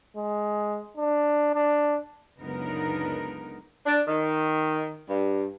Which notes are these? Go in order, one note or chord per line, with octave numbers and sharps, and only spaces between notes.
G#3
D4
D4
C#2 F#2 D3 B3 D#4 A#4
D4
D#3
G2